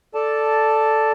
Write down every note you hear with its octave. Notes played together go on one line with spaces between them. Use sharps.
A4 D5 A5